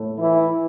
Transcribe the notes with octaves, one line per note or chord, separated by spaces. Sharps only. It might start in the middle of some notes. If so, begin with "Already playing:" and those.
Already playing: A2 A3
E3 E4